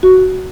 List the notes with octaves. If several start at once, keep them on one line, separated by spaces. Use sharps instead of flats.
F#4